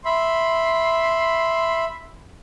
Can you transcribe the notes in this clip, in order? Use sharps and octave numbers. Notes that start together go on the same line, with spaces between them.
E5 B5 C6